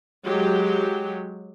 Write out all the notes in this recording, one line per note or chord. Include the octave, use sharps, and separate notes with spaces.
F#3 G#3 G4